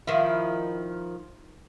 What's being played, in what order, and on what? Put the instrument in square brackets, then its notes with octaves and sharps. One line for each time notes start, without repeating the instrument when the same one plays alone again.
[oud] D#3 F3 E4